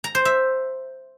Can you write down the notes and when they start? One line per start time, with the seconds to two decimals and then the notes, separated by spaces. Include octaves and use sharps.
0.04 A#5
0.15 C5
0.25 E5